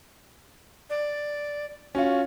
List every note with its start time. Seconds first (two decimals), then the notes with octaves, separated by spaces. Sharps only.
0.90 D5
1.95 C#4 F4 F#4